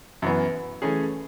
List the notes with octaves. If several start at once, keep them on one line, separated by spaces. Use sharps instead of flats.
F#2 E3 B3
E3 A3 C#4 G#4